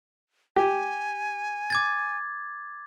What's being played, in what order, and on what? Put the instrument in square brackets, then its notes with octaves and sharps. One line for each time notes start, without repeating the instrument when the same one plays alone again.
[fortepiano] G4 [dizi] G#5
[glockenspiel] D6 G#6 A6